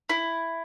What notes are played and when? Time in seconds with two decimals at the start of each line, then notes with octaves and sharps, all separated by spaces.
0.09 E4